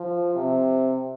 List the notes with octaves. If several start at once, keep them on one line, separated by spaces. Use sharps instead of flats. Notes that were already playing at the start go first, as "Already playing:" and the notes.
Already playing: F3
C3